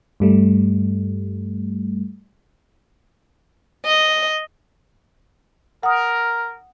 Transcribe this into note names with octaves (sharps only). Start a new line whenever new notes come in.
G2 G3 A3
D#5
A#4 F#5 D#6